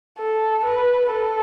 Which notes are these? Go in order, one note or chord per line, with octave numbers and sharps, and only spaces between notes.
A4
B4
A4